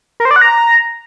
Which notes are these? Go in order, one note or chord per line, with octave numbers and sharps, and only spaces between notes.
A#4
C5
D5
F#5
A#5